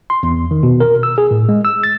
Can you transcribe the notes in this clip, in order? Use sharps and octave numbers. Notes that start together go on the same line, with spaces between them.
C6
E2
D#3
B2
A#4
E6
G#4
A2
G#3
E6
A6